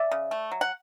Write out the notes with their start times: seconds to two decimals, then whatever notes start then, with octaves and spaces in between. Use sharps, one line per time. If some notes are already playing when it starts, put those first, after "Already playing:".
Already playing: D5 E5
0.11 C#3
0.31 A3
0.51 F#3
0.61 F#5